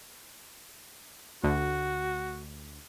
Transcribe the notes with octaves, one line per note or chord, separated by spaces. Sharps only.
D2 F#4